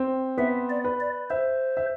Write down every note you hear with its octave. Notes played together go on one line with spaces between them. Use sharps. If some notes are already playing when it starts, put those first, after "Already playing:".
Already playing: C4
B3 E5
D5
B4
D5
C5 E5
E5